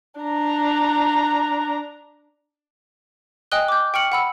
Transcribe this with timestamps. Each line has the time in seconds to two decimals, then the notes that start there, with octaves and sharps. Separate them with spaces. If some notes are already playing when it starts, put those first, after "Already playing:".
0.21 D4 A#5
3.52 D#5 G5 G#5 D#6 F#6 G7
3.68 D6 G6
3.94 G5 C#6 F6 C#7 F#7
4.12 F#5 B5 E6